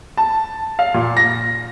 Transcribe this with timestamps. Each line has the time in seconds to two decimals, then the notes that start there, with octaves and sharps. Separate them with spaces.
0.17 A5
0.79 F5
0.94 A#2
1.17 A#6